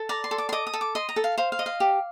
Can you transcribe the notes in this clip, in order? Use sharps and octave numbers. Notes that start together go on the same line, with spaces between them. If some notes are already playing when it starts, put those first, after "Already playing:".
Already playing: A4
D5 A#5
C6
A4
D6
C6
D#5 D6
D#6
A4
D6
D#5 C6
A#5
A4
F5
C5 F5
F5
D#5
F5
G4